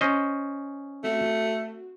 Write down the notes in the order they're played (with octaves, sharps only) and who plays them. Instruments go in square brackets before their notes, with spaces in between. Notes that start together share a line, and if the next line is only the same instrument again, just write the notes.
[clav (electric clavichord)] C#4 C5 D#5
[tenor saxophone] A3 [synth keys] C4 F#4